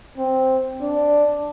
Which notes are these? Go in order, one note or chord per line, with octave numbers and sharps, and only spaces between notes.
C4
D4